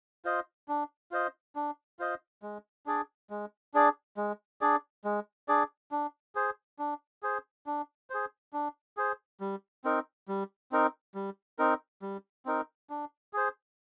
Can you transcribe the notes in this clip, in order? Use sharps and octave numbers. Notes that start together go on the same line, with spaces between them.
F4 C5 D#5
D4
F4 C5 D#5
D4
F4 C5 D#5
G#3
D4 G#4 D5
G#3
D4 G#4 D5
G#3
D4 G#4 D5
G#3
D4 G#4 D5
D4
G#4 C5
D4
G#4 C5
D4
G#4 C5
D4
G#4 C5
G3
C4 D#4 A#4
G3
C4 D#4 A#4
G3
C4 D#4 A#4
G3
C4 D#4 A#4
D4
G#4 C5